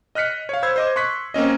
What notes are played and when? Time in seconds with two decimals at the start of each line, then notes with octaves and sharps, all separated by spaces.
0.15 D#5 F6 F#6 B6 C#7
0.49 C#5 F5
0.63 C5 B5 E6 G#6
0.76 C5 D#5 D6
0.96 C6 C#6 F#6 B6
1.34 A#3 C4 C#4 D#5